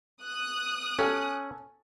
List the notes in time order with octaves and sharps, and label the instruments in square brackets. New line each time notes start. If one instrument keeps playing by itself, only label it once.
[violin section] D#6 F#6
[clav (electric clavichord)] C#4 [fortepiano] A4 G#5